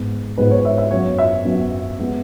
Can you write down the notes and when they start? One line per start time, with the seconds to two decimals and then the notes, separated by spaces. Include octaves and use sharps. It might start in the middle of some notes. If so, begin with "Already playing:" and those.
Already playing: G#2 G#3 B3
0.38 G#2 G#3 B3 B4
0.51 C#5
0.65 E5
0.78 E5
0.91 F#2 F#3 B3 C#5
1.19 E5
1.44 F#2 F#3 B3
1.99 G#3 B3